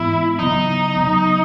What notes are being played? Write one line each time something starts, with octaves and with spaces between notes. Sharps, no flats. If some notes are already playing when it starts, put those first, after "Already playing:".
Already playing: G#2 E3 B3 E4
C#3 F#3 B3 D#4
C#3 F#3 B3